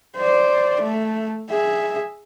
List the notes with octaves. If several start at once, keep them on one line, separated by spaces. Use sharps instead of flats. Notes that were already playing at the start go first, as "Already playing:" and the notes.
C5 D5
A3
G#4 E5